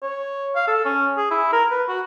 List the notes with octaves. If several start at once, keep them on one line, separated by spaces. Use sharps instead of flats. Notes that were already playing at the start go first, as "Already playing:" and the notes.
C#5
F5
A4
C#4
G#4
E4
A#4
B4
F#4